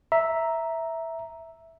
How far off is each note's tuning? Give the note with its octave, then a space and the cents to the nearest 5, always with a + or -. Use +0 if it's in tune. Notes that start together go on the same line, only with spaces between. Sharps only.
E5 -5 A#5 +0